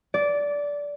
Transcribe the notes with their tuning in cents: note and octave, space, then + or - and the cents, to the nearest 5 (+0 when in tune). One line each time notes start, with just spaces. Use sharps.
D5 -15